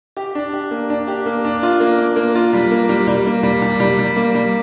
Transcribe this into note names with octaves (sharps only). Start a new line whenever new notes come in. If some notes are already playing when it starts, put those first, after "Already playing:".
G4
D4
G4
A#3
D4
G4
A#3
D4
F4
A#3
A#3
A#3
F4
G3
A#3
G3
G3
A#3
G3
G3
G3
G3
A#3
G3